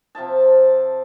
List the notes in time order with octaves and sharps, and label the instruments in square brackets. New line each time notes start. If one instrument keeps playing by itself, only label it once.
[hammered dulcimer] C3 F3 E5 A5